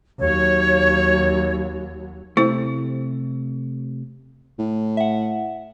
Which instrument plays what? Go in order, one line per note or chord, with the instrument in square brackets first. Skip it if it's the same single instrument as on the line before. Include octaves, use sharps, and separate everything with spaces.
[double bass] D#2 F#3 [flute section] C#5
[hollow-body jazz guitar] C3 A3 [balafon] E4 C5
[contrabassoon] A2
[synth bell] E5 F#5